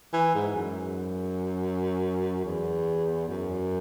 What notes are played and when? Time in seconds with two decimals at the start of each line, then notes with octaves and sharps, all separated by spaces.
0.13 E3
0.35 G#2
0.55 F#2
2.44 E2
3.29 F#2